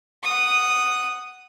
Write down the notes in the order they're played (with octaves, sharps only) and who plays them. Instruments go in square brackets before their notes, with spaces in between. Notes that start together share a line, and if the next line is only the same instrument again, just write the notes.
[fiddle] F#5 D#6